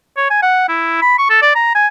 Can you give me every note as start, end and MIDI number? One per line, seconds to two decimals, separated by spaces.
0.17 0.27 73
0.30 0.40 80
0.43 0.64 78
0.69 0.99 64
1.02 1.16 83
1.19 1.29 85
1.30 1.38 69
1.42 1.51 74
1.55 1.73 82
1.75 1.87 80